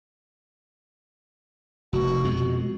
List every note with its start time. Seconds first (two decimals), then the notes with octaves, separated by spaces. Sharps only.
1.93 F1 F#4
2.24 F2 B2 G#3